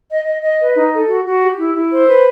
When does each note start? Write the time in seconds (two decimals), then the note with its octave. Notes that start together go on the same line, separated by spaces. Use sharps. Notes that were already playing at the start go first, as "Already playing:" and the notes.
0.09 D#5
0.26 D#5
0.43 D#5
0.59 B4
0.75 D#4
0.92 A4
1.08 F#4
1.25 F#4
1.42 G4
1.58 E4
1.74 E4
1.91 C5
2.08 B4